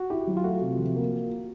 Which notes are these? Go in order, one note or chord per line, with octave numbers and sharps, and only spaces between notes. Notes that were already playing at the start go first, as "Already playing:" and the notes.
Already playing: F#4
E4 G4
F#3
F4
A3 F#4
C3
F3
A#3